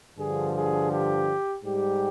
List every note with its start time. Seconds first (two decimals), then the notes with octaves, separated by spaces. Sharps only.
0.18 G2 D3 F3 G#4
0.55 G#4
0.91 G4
1.64 G#2 G3 G4